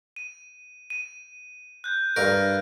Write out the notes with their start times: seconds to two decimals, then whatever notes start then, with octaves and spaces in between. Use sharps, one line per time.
0.16 D#7
0.90 D#7
1.84 F#6 G6
2.16 G2 A#4 D7